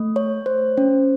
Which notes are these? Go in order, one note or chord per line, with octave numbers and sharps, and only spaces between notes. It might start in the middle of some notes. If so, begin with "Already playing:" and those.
Already playing: A3
C#5
C5
C#4